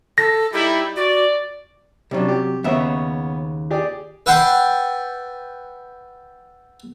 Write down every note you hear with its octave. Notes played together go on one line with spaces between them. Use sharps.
A4 A#6
G3 D#4 E4 G4
F#4 D5
C3 F#3 G3 C#4 D4
G4
D#2 C#3 B3 C#4 C#5 E5
G4 G#4 D5
B4 E5 F#5 G5 A5 C6